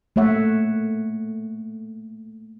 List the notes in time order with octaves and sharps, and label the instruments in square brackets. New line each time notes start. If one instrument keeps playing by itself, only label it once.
[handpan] A3 A#3 C#5 E5 F#5